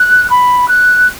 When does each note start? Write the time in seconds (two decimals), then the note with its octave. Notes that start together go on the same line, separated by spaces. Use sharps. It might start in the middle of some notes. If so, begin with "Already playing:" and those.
Already playing: F#6
0.29 B5
0.68 F#6